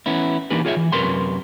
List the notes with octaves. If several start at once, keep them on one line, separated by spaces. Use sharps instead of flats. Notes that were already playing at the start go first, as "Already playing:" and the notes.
E3 B3 C#4 E4
E3 A#3 D4 D#4 G4 B4
F4 G#4 C#5 D5 E5
E3
F#2 C3 A#4 B4 C#5 C6